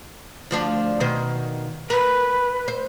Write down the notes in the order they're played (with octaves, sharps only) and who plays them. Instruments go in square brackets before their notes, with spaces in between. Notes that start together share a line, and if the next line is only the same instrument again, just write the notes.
[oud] D2 F3 D4
B2 D#3 C5
[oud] A#4 [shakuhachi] B4
[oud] C5